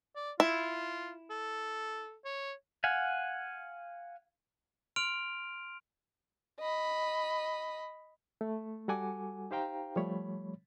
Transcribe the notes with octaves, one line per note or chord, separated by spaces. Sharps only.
D5
E4 F4
A4
C#5
F5 F#5 G#5
C6 F6 D7 F7
D#5 B5
A3
G3 F#4 A4 F#5 G#5 D6
D#4 G4 C5 F5 G5 A#5
F3 G3 A3 C#5 B5